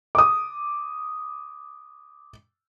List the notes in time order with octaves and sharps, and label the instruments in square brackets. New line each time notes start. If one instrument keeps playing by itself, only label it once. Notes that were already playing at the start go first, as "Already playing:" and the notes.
[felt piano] D6 D#6